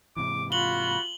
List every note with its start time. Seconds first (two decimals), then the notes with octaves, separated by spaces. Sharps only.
0.17 G#2 C3 E3 D6
0.52 F4 F#4 B5 F#7 G7